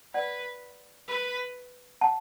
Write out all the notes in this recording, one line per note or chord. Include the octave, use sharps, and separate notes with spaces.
B4 D5 F#5
B4
F#5 A5